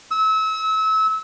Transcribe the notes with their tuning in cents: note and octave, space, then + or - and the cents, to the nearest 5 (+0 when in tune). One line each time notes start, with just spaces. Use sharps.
E6 -30